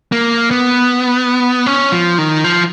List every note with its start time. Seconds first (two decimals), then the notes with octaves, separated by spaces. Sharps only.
0.12 A#3
0.51 B3
1.66 C#4
1.92 F3
2.18 D#3
2.44 F3